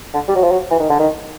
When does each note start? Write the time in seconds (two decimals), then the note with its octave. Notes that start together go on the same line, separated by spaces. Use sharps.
0.14 D3
0.28 G3
0.36 F#3
0.43 F3
0.52 F#3
0.71 E3
0.80 D#3
0.90 D3
0.99 D#3